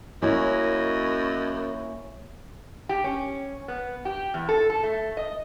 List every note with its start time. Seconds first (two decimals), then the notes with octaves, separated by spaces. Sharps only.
0.22 F#2 A#3 C#4 E4 D#5
2.89 G4
3.04 C#4
3.68 B3
4.05 G4
4.34 E2
4.49 A4
4.70 A4
4.83 A3
5.17 D#5